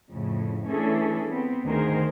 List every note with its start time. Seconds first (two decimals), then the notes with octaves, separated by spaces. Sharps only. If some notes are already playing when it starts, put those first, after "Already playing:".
0.13 F2 A2 C#3
0.68 E3 A3 C#4 D4 G#4 A4
1.29 B3 C4
1.66 D2 D#3 G#4 A#4 C5